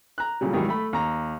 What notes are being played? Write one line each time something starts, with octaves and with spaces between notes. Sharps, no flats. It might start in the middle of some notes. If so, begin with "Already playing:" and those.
A#5 F#6
A#2 C#3 F#3 G3
G#2 B2 D#3 E3 F#3 G3
A3 B5
D#2 A#5